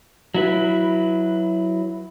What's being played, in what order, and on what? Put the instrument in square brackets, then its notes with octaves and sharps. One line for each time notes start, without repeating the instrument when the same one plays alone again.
[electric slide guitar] F#3 E4 B4